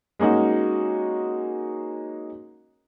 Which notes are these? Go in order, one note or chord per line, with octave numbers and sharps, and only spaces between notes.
G#3 A#3 C#4 D#4 F#4